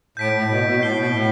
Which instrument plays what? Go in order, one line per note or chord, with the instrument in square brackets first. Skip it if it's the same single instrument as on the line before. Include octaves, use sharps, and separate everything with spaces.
[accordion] A2 [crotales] G6 B6 D7
[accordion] A2
B2
B2
[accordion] A2 [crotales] G6 C7 G7
[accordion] B2
A2